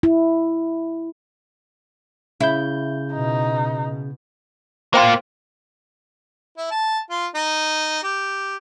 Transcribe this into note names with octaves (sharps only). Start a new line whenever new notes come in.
E4
C#3 E4 G6
B2 D#4
A#3 F4 C5 G5 C6
E4
A5
F4
D#4
G4